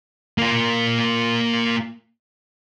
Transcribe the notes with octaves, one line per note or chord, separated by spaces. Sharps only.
A#3 F4